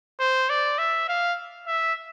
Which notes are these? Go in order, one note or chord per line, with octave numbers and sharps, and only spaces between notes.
C5
D5
E5
F5
E5